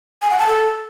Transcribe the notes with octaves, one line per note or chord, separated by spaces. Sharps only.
G#5
F#5
A5
A4